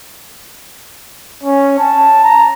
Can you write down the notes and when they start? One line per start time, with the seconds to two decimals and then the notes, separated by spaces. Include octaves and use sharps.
1.43 C#4
1.79 A5
2.24 A#5